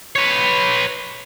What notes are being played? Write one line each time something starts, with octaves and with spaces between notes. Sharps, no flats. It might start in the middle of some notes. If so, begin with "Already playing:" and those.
B4 C#5